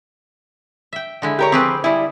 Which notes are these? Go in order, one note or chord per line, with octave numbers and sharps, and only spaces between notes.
E5 G5
D3 G#3 E4
G4 A#4 C#5
F3 C4 G4 G#4 B4
G3 E4 G#4